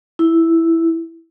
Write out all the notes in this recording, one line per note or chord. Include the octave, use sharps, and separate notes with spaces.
E4